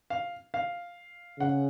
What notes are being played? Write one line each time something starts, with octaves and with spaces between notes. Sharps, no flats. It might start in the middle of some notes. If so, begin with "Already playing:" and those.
F5
F5
C#3 F#5